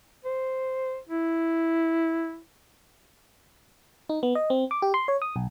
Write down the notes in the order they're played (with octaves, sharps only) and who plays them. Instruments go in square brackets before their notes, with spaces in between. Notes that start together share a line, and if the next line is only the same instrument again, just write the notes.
[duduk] C5
E4
[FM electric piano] D#4
B3
D#5
C4
D6
G4
C6
C#5
D#6
B1